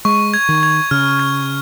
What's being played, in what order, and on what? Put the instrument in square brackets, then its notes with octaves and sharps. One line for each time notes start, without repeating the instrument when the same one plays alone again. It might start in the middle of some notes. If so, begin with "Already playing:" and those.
[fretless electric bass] G#3 [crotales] C#6
[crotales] G#6
[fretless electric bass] D#3
[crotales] G#6
[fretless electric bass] C#3 [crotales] F6
[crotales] G#6